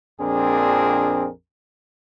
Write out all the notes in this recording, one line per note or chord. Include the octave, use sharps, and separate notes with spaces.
A#1 F2 C4 D4 G#4 A#4